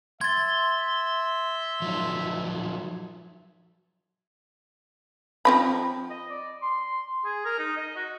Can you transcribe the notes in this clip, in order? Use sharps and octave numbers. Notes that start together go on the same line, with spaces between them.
E5 C6 G#6 A6
F3 F#3 D#4
F3 C4 B5
D#5
D5
C6
G#4
A#4
D#4
D#5
F#4